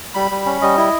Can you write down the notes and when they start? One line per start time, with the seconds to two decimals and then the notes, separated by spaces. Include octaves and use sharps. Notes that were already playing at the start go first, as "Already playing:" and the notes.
0.15 G3 B5
0.31 G3
0.46 C#4
0.62 G3 D#5
0.77 E4